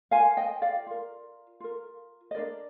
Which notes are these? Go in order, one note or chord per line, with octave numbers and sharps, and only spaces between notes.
F4 A#4 F5 G#5
D#5 G5
D5 F5
F4 A#4
F4 A#4
D#5
D4 F4 A#4 D5